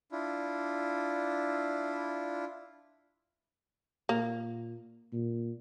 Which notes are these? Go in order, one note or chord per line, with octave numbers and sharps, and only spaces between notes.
D4 E4 F4
A#2 A#3
A#2